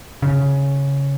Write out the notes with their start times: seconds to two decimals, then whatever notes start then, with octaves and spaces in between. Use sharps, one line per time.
0.22 C#3